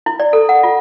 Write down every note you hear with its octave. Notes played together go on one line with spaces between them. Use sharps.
E4
D5
A4
F#5
F4